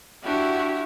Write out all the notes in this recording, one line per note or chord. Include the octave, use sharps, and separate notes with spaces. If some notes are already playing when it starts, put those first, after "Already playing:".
D4 E4 F#4 G4 E5